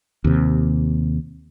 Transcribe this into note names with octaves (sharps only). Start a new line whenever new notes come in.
D#2 C3